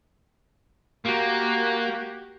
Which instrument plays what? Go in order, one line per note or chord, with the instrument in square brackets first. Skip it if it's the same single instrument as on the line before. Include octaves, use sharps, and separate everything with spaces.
[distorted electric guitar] A#3 [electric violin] F#4 G4